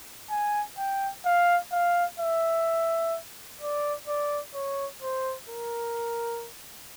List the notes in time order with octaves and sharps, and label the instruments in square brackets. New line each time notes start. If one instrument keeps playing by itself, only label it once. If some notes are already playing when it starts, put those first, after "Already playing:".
[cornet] G#5
G5
F5
F5
E5
D5
D5
C#5
C5
A#4